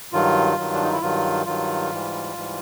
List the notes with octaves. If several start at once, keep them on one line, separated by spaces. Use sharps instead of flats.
G2 D#3 F#3 F4
G2 D#3 F#3
D4
D#4
E4
G2 D#3 F#3 F4
G2 D#3 F#3 F4
G#2 E3 G3
G#2 E3 G3